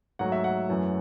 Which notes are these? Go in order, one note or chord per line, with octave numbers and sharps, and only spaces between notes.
G#2 F#3 A3 F#5
E5
F#5
F#2 E3 A3